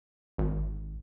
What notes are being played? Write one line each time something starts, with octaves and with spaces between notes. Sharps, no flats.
G#1